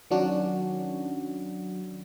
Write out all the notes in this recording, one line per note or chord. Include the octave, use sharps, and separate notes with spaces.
D#3 F#3 C#4 D4 F#4